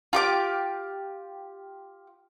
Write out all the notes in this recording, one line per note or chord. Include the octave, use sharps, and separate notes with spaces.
F4 G4 D6